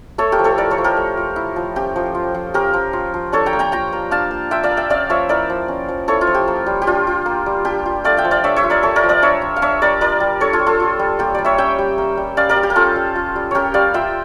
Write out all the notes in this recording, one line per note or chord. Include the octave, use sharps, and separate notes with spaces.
A3 A4 C#5
G4 A#4
F3
A4 C#5
E4 A#4 D5
A4 C#5
F3
G4 A#4
A3
F3
E4
F3
C#4 G4
F3
F4
F3
C#4 G4 A#4
F3
F4
F3
D4 A4 C#5
G5 A#5
A#3
G5 A#5
F4 G5 A#5
A#3
D4 F5 A5
A#3
F4 E5 G5
D5 F5
A#3
E5 G5
C#4 D5 F5
F3 C#5 E5
E4 A#4 D5
F3
C#4
F3
E4 A4 C#5
F4
F3
G4
A#3
G3
G4
D4 F4
F4
A#3
G3
D4 G4
F4
A3 D5 F5
E5 G5
F3
D5 F5
D4 C#5 E5
C#5 E5
F4
A#4 D5
A3 A4 C#5
A#4 D5
F3
A#4 D5
D4 C#5 E5
F4
F5
D4 C#5 E5
G3 A#4 D5
F4 A#4 D5
G3
D4 A4 C#5
F4 A4
G3
F4 A4
F4
G3
A#3 G4
G3 D5
C#5 E5
C#4 E5 G5
G3
A#3
G3
C#4 D5 F5
A#4 D5
G3
G4
A#4
C#4 F4 A4
G3
F4
G3
C#4 G4 A#4 C#5
G3 D5 F5
F4 E5 G5